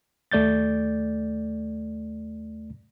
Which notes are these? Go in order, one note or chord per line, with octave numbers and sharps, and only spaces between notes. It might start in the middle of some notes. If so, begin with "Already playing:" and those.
D#2 A3 D5 G6 A6